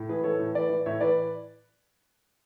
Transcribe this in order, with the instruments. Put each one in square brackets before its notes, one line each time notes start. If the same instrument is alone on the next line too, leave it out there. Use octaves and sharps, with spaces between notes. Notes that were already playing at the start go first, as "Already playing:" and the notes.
Already playing: [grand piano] A2
E3 G#4 B4
E3 A4 C#5
A2
E3 B4 D5
E3
A2 C#5 E5
E3 B4 D5